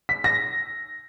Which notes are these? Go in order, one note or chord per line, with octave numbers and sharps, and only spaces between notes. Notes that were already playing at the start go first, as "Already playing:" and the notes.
B6
A#6